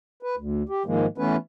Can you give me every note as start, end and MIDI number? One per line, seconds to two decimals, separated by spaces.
0.23 0.35 71
0.37 0.63 38
0.69 0.83 67
0.86 1.06 44
0.86 1.06 51
0.86 1.06 53
0.86 1.06 56
0.86 1.06 58
1.18 1.36 52
1.18 1.36 57
1.18 1.36 59
1.18 1.36 61
1.18 1.36 71